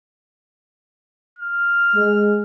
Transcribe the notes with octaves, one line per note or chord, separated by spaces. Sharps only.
F6
G#3